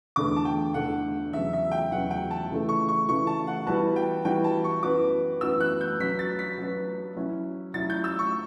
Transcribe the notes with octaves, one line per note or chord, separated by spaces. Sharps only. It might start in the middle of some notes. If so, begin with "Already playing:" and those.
E2 D3 A3 D4 A4 D6
A5
G5
E2 D3 A3 D4 A4 F#5
E2 C#3 F#3 E5
E5
G5
E2 C#3 F#3 F#5
G5
A5
C#3 E3 A3
C#6
C#6
C#3 E3 A3 C#6
A5
F#5
E3 G3 B3 F#4 B4 A5
G5
E3 G3 B3 F#4 B4 G5
A5
C#6
F#2 E3 B3 F#4 B4 D6
F#2 E3 B3 F#4 B4 E6
F#6
G6
F#3 C#4 F#4 B4 B6
A6
B6
F#3 C#4 F#4 B4
F#3 C#4 E4
F#3 C#4 E4 A6
G6
E6
C#6